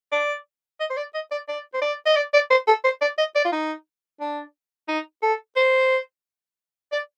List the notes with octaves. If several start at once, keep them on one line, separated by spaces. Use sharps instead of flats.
D5
D#5
C5
D5
D#5
D5
D5
C5
D5
D#5
D5
D5
C5
A4
C5
D5
D#5
D5
F4
D#4
D4
D#4
A4
C5
D5